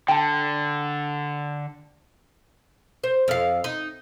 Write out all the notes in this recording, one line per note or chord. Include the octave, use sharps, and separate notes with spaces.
D3 G5 A5
C5
F2 F5
D#4